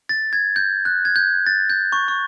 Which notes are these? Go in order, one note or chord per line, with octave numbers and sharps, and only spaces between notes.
A6
G#6
G6
F#6
G#6
G6
A6
G6
C#6
C#6